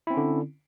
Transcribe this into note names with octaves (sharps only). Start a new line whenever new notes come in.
D3 C4 C#4 E4